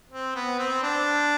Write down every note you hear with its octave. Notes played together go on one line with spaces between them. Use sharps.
C4
B3
C4
D4